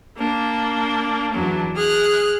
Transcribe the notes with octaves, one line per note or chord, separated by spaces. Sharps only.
A#3 D4
E2 F#3 D4
G#4 F6 F#6